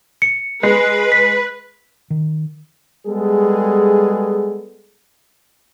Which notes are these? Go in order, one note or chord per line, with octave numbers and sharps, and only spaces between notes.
C#7
G#3 B4
B6
D#3
G3 G#3 B3 G#4 A4